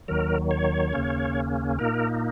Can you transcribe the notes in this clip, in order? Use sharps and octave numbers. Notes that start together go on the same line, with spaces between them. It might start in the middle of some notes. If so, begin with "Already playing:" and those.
D#2 D#3 F#3 A#4
C#5
D#2 C#3 A#3 C#4
A#2 A#3 D#4 A#4